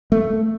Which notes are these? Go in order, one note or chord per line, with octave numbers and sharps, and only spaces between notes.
A3